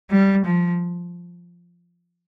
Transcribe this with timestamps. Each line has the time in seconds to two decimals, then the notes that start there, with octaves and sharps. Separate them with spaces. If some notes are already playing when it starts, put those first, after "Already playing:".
0.11 G3
0.46 F3